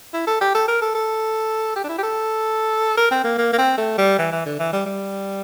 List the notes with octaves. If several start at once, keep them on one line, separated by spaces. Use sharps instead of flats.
E4
A4
G4
A4
A#4
A4
A4
G4
D4
E4
G4
A4
A#4
C4
A#3
A#3
A#3
C4
A3
G3
E3
E3
D3
E3
G3
G3